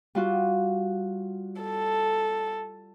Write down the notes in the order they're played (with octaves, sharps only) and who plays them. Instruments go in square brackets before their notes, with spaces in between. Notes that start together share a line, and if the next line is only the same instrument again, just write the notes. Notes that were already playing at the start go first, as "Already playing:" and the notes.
[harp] G3 F4 F#4
[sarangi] A4